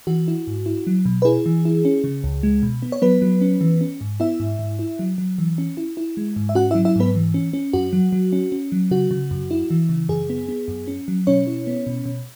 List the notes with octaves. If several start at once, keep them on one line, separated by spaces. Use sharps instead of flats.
E3 F#4
E4
G#2
E4
F#3
B2
B4
E4 G#4
E3
E4
C#4
C#3
C#2
G#3
B2
B3
C#5
F#3 B3 B4
F#3
C#4
E3
C#4
G#2
B3 E4 E5
G#2
G#2
E4
F#3
F#3
E3
C#4
E4
E4
G#3
G#2
E5
C#4 F#4 F#5
F#3 E4 E5
E4 E5
G#2 B3 B4
E3
C#4
C#4
F#2 F#4
F#3
F#3
C#4
C#4
F#3
C#3 F#4
C#3
F#2
E4
E3
C#3
F#2 G#4
B3
B3
F#2
C#4
F#3
B2 C#4 C#5
E4
B3
B2
B2